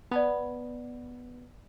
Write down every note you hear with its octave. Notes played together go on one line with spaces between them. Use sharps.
B3 D5 A5 B5